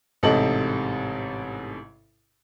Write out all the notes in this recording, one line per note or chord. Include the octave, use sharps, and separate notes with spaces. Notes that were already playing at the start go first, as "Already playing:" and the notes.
A1 G#2 C3 A4 D#5 F#7